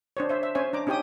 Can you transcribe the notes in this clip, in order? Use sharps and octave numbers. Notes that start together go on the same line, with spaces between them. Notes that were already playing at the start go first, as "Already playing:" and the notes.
D4 C5 C#5
C5 E5
E5
C#4 C5 C#5 E5 G#5
D4 A#5 D6
C#4 D#4 G4 C#5 G5 D#6